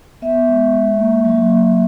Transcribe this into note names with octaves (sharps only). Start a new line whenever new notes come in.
B3 E5
G#3
G#3
A#3
F#3
A#3